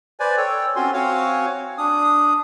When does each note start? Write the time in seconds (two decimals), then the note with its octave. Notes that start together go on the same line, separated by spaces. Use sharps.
0.20 B4 C5 D5 G#5
0.37 A4 C#5 G5
0.76 C4 C#4 F4 F#4 G#5 C6
0.93 C4 F#4 C#5 F5 F#5 G#5
1.78 D4 D#6